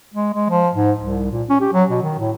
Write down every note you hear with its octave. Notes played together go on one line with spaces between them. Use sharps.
G#3
G#3
F3
G#2
C2
A#2
C#4
G4
F#3
B2
D#3
A2